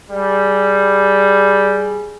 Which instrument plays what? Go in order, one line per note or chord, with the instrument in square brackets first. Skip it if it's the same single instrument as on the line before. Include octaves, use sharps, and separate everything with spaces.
[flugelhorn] G3 [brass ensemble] G#4